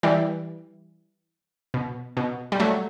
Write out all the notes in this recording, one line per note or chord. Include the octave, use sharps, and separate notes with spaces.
E3 G3
B2
B2
G3
F#3 A3